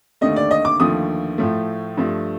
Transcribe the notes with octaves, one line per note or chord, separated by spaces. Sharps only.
D#2 D3 A3 D#5
D5
D#5
D6
D#2 D3 F3 A3 D#6
A2 F3 A3
G2 F3 A3